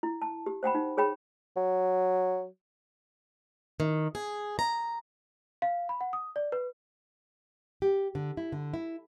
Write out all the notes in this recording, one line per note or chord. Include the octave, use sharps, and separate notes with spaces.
E4
A5
G4
C5 F#5 G5 B5
D#4
G#4 C#5 G5 B5
F#3
D#3
G#4
A#5
F5
B5
F#5
D#6
D5
B4
G4
D3
E4
D3
E4